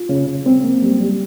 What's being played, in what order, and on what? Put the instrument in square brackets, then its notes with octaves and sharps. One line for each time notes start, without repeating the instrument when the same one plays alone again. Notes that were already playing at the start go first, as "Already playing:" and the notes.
Already playing: [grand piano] F4
C#3
C#3
C4
A#3
G3
G3